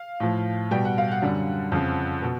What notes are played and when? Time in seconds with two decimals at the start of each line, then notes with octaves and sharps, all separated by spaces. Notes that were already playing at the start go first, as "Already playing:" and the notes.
Already playing: F5
0.20 A2 F3
0.71 B2 G3 G5
0.85 F#5
0.98 F5
1.12 F#5
1.22 F#2 D3 G3
1.72 F2 C#3 F3
2.22 B2